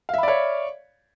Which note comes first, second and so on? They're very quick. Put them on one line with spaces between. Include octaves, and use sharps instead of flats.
F5 E5 B5 D5 C#5